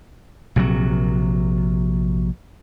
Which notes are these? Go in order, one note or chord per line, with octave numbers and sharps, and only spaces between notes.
A#1 C3 F3 F#3